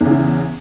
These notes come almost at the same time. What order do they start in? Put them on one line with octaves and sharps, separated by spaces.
E2 C#3 E3